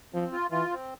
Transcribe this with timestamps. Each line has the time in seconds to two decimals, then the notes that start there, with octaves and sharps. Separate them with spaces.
0.13 F3 C4
0.32 F4
0.51 E3 F4
0.70 C4